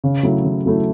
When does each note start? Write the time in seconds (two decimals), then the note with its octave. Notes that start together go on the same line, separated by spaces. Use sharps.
0.04 C#3
0.23 F#3 A3 E4
0.44 C#3
0.66 F#3 A3 E4